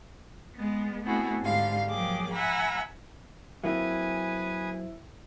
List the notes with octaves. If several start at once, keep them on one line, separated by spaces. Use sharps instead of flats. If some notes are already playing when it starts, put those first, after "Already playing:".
G#3 B3
A3 B3 C4 E4 F#4 G#4
G#2 D3 G3 F5 C6
F3 F#3 A#3 G#4 G5 D6
E5 F#5 G#5 A#5 B5
F#3 A#3 C4 E4 G#4 B4 G#5